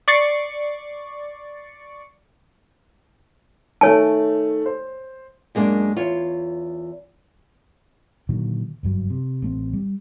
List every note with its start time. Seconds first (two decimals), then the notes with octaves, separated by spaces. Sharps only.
0.08 D5 C#6 A6 C7 C#7
3.81 D#3 A3 C#5 G#5 A5
4.66 C5
5.55 F#2 G#3 A#3 B3 D4
5.96 E2 F4 C#5
8.29 A#2 D3 D#3 F#3
8.83 F#1 G2 F#3
9.10 C3
9.42 A1 A3 C4
9.73 G3